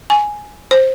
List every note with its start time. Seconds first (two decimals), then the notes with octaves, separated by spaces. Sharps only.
0.10 G#5
0.71 C5